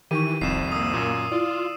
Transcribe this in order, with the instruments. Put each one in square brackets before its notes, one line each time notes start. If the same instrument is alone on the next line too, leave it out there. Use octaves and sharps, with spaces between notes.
[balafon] D#3 D#4 C#6 [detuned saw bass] E3 [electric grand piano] G4 [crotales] D#7
[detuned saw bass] D#1 [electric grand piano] C2 F2 [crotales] C7 E7
[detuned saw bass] A#3 [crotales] D#6 E6
[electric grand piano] F#2 A#2
[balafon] E4 [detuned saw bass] F4 [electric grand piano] D5